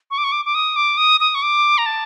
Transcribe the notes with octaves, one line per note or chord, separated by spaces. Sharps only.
C#6
D6
C#6
D6
D6
D#6
D6
D#6
D#6
C#6
D6
A#5
A5